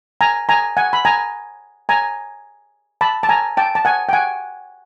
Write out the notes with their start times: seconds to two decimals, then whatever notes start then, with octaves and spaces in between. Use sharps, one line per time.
0.21 G#5 A#5
0.49 G#5 A#5
0.77 F#5 G#5
0.93 B5
1.05 G#5 A#5
1.89 G#5 A#5
3.01 A5 B5
3.23 A5
3.29 G#5 A#5
3.57 G5 A5
3.75 A5
3.85 F#5 G#5
4.09 G5
4.13 F#5 G#5